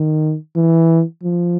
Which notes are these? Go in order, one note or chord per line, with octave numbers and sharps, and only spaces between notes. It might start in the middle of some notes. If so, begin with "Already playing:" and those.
Already playing: D#3
E3
F3